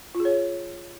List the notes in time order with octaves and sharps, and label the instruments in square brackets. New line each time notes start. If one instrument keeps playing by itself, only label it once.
[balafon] F4
G#4
C#5